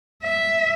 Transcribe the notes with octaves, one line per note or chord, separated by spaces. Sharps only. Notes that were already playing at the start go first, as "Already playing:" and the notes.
E5